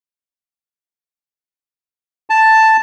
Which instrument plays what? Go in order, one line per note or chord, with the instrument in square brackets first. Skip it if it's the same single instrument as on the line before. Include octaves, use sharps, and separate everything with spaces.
[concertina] A5